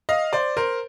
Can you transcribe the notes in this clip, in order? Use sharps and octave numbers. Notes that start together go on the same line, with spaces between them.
D#5 F5
C5 D5
A#4 C5